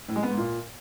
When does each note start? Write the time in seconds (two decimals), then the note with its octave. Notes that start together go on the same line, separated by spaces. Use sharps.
0.08 A2
0.16 G#3
0.23 B3
0.30 G#2
0.37 A#2